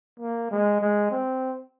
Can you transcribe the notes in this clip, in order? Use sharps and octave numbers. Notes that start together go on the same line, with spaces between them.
A#3
G#3
G#3
C4